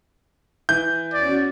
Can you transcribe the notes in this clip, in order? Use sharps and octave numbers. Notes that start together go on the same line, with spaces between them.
E3 G6
E2 C#4 F#4 D5